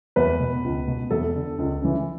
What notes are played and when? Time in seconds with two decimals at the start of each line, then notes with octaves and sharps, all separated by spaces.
0.16 E2 B4
0.40 B2
0.64 C#2
0.88 B2
1.11 E2 A4
1.35 D3
1.59 C#2
1.82 C#3 E3